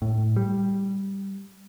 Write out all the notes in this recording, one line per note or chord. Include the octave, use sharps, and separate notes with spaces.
A2
G3